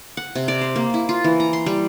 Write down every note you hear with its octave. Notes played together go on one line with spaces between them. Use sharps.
F#5
C3
D5
C5
A#3
E4
F4
E3
A#5
C6
G3